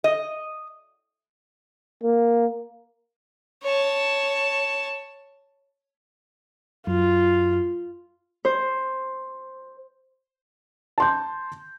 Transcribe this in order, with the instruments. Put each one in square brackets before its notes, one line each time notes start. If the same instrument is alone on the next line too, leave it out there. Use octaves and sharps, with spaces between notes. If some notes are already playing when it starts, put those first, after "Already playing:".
[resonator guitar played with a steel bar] D#5
[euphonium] A#3
[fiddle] C#5 A5
[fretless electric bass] F#2 [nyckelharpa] F4
[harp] C5
[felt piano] A5 C6 G6